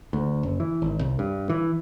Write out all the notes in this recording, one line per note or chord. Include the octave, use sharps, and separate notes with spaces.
D2
F#1
E3
G#1
C2
G2
E3